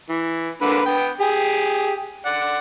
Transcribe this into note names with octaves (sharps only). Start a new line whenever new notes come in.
E3
D3 A#3 B4
B3 G5
G4 G#4
D5 F#5